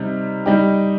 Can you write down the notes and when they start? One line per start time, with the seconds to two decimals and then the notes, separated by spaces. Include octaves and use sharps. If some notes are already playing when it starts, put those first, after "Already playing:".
Already playing: C3 G3 D#4
0.46 G3 D#4 G4